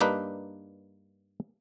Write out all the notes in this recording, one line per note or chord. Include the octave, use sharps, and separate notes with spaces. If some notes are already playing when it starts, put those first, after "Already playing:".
G2 A#3 D4 D#4 B4